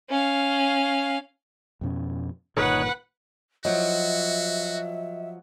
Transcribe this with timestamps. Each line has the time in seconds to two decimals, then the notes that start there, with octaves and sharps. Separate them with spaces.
0.10 C#4 F5
1.81 F2 B2 C#4
2.57 G1 A#2 D#3 D#4 B4 C#5 F#5
3.65 F3 F#3 F#4 D#5 E5